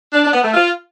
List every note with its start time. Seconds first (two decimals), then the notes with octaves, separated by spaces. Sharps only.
0.13 D4
0.23 D4
0.33 B3
0.44 A3
0.54 F4